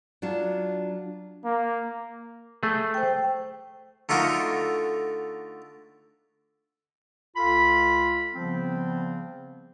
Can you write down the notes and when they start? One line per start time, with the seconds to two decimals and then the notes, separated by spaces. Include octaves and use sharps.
0.22 F#3 D4 F4 A5
1.45 A#3
2.63 A3 G#4
2.94 C5 G5
4.09 D3 A3 D#4 F4 F#4 A#4
7.36 C#2 F4 A4 F5 B5
8.35 C#3 F3 G3 B3 C4